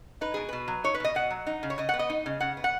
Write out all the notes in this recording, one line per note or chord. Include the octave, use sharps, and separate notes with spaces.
D#4 B4
B2 G#4
B2 B4
F#3
D#4 C#5
B4
B2 D#5
B2 F#5
F#3
D#4
C#3
C#5
C#3 D#5
F#5
B3
D#5
D#4
C#3
C#3 F#5
B3
F#5